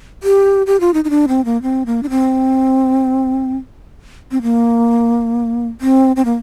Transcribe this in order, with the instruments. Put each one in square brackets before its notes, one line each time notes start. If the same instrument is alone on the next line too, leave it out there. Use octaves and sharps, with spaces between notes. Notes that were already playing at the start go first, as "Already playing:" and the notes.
[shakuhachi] G4
G4
F4
D#4
D#4
D4
C4
A#3
C4
A#3
D4
C4
C4
A#3
C4
C4
A#3